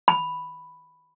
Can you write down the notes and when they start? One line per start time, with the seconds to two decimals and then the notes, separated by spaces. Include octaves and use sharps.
0.08 B5